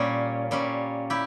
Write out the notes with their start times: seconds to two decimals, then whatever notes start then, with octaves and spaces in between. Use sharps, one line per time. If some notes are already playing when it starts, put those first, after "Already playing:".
Already playing: A#2 G3 C#4
0.51 A#2 G3 C#4
1.10 E4 G4